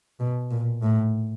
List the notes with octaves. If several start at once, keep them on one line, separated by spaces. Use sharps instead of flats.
B2
A#2
A2